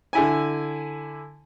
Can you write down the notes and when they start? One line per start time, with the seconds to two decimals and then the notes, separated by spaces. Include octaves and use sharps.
0.13 D3 E4 G#5